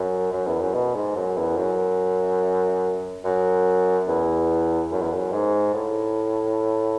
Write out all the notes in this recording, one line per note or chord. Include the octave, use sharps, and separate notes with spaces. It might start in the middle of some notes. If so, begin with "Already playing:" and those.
Already playing: F#2
F#2
E2
F#2
B2
G#2
F#2
E2
F#2
F#2
E2
F#2
E2
F#2
G#2
A2